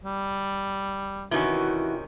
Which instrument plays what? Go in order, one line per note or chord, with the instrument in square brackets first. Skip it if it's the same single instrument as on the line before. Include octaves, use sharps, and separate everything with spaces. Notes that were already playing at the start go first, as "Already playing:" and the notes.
[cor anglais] G3
[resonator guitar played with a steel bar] C3 D#3 C#4 [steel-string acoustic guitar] E3 E4 [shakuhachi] F#4